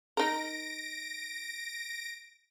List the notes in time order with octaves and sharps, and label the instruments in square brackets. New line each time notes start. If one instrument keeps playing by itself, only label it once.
[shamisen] D#4 A#4 [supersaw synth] A#6 D7